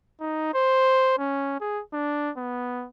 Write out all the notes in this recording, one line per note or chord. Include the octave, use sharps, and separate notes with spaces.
D#4
C5
C#4
G#4
D4
B3